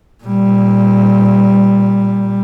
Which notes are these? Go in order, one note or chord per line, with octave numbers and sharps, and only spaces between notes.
A#2 G3